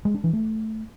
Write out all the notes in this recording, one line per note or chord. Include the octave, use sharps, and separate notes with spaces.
G#3
D4
E3
A3